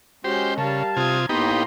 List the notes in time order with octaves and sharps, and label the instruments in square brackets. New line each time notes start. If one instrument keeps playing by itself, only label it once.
[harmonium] G#3 C#4 [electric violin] F#4 G6 [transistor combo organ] G4 C5
[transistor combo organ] C#3 [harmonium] G3 A5 [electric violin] A#4 F5
[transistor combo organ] C3 F4 [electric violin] D#6 G#6
[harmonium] A2 A#3 [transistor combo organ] B3 D#4 G4 [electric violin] A#5 C6